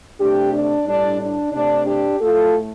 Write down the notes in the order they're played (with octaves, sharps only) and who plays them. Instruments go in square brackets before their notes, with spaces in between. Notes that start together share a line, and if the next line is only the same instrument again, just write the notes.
[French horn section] C3 A3 D4 G4
D4
A2 G3 D4
D4
C3 A3 D4
D4 G4
A2 A3 F4 A4